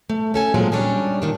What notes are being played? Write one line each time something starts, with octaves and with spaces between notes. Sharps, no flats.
A3
C#4 A4 G#5
A#2 F#3 G#3 C4 D#4 G#4
D#3 G3 C#4 D4
A#2 D#3 D4